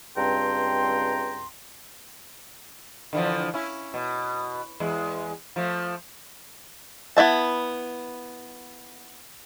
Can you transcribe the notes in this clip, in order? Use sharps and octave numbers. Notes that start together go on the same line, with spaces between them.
C#2 G2 C4 G5 A#5 C6
D3 E3 F3
C#4 E4
B2
E2 G#3
F3 A3
B3 E4 E5 A5